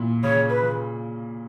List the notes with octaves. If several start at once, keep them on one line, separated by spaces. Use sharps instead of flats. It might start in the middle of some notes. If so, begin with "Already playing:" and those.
Already playing: A#2 E4
C#3 C#5
B4
C#3